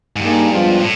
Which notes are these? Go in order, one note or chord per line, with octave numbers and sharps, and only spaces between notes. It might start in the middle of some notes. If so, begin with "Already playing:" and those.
G#2
G2 G3 A#3 D#4 G#4
F3 G#3 B3 D4 F4
A2